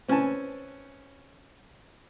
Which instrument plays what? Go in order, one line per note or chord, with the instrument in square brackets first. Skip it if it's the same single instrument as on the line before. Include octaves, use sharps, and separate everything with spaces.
[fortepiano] C4 C#4 B4 G#5 A5